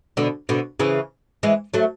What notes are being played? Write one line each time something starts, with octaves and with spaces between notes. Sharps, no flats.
B2 D3
B2 D3
C#3 E3
E3 G#3
F#3 A3